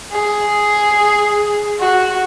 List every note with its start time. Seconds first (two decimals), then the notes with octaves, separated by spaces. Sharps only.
0.12 G#4
1.80 F#4